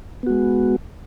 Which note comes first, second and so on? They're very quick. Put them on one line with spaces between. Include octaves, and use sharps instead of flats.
B3 F#4 G#3